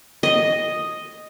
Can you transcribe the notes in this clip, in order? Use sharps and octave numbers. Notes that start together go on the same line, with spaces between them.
D#5